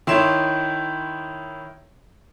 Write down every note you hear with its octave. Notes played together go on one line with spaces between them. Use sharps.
D#3 E4 C#5 C6 E7